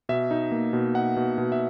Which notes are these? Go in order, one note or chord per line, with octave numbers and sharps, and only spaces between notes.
B2 E5
D#4
A#3
B2
D#4 F#5
B2
B2
E5